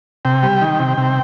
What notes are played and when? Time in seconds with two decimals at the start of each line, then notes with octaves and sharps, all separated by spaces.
0.25 C3 G5
0.43 G3
0.61 D#3
0.79 C3
0.98 C3